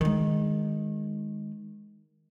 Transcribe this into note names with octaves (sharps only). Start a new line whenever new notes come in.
D#3 G#3